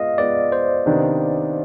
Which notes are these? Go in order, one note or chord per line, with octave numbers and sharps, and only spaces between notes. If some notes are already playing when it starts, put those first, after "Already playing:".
Already playing: G#3 B3 F4 D#5 F5
G#3 B3 F4 D5
C5
C3 D#3 B3 D4